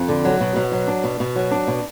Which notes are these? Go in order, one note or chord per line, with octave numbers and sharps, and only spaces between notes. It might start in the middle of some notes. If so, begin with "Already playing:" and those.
Already playing: F2
D3
F#3
B2
B2
F#3
D4
B2
B2
F#3
D4
B2